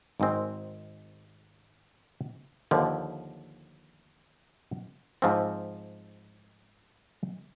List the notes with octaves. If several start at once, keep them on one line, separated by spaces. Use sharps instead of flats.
G#1 G#2 D#3 G#3 C4
D#2 D3 F3
G#2 F3 C4